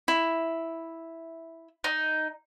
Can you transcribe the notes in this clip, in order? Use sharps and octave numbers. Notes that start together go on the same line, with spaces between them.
E4
D#4